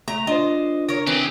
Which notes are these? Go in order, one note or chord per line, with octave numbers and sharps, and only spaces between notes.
A3 A#5
D4 F4 C5 D#5
A#4 C#5
E3 C4 G4 G#4